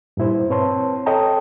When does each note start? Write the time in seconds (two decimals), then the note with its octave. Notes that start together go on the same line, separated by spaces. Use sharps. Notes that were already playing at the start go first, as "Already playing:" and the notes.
0.17 G2 A#2 E4 C5
0.50 C4 B4 C#5 A5 C6
1.06 A4 C#5 D#5 G5 A5 A#5